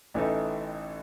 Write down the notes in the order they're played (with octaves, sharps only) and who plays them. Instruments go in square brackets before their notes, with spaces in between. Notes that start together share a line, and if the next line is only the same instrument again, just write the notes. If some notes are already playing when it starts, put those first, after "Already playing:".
[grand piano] A1 A2 E3 A3 D#4